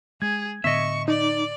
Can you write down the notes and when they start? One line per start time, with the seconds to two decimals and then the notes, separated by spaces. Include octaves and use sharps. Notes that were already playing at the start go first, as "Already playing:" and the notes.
0.22 G#3 G#4 G#6
0.64 A2 D3 B3 D#5 E5 C#6
1.08 D#4 D5